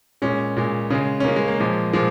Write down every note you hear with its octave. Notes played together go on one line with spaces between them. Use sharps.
A#2 G#3 C#4
A#2 G#3
C#3 G#3
C#4
C#3 G#3 A#3
G#3
A#3
A#2 F3 G#3
A#2 F3 G#3